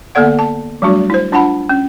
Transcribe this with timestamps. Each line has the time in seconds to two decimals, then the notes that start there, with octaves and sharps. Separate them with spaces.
0.15 D3 A#3 B3 A4 D5 F#5
0.39 A5
0.82 F#3 G3 A3 D4 F#4
1.10 E4 C5
1.32 D4 F4 F#5 A5 B5
1.69 C#4